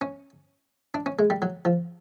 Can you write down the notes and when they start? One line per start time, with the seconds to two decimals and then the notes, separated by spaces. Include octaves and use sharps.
0.01 C#4
0.94 D4
1.06 C#4
1.19 G#3
1.30 G3
1.42 F#3
1.65 F3